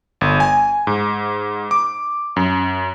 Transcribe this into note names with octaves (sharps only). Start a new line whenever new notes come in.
G1
G#5
G#2
D6
F#2